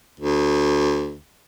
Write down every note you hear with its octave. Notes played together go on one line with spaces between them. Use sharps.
D2